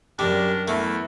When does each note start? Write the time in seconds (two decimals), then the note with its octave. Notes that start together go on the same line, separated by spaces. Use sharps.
0.19 F#2 G3 D4 A#4
0.68 E2 A3